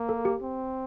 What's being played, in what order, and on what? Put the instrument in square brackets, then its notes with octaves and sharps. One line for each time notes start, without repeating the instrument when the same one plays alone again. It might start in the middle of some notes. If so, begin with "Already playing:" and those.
Already playing: [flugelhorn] A#3
[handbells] A4
G4
[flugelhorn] C4